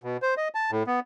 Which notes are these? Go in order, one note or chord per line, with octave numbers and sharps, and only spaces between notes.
B2
C5
D#5
A5
A2
B3